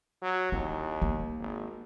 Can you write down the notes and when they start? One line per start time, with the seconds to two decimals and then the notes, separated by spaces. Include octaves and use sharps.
0.22 F#3
0.52 D#2 E4
1.02 A#3
1.39 G#1